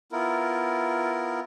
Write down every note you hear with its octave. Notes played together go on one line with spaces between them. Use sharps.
B3 E4 F4 A#4